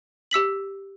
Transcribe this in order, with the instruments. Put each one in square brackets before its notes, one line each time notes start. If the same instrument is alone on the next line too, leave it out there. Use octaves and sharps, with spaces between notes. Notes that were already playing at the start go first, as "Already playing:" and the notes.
[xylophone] G4 E6 B6 F#7